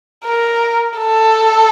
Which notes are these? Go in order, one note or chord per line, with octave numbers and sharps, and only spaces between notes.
A#4
A4